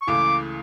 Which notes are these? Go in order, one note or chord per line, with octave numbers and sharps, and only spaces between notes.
C#6
C#2 C#3 E3 A3 D6